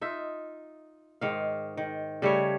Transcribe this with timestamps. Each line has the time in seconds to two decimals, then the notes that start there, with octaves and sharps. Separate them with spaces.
0.01 D#4 F4 E5
1.21 G#2 D#3 F5
1.77 D#3
2.22 C#3 G3 A3 C#5